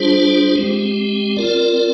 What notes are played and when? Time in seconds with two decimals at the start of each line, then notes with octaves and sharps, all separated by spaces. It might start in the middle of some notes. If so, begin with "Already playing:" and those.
Already playing: G3 D4 F4 G#4 C5
0.56 G#3 C4 G4
1.36 C4 F4 A#4 D5